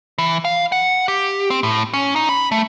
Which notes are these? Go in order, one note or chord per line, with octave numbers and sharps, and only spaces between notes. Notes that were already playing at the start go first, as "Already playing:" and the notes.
E3
F5
F#5
G4
C4
A2
C#4
D#4
B5
A3